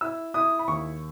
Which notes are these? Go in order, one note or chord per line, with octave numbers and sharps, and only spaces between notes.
E4 E6
E4 D#6
B5
D#2 C#6